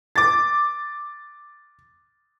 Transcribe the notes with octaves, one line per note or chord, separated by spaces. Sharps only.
D6 A6